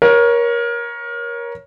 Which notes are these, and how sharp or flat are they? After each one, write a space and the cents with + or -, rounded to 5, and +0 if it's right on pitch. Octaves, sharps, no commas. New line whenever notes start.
A#4 +25 C#5 +0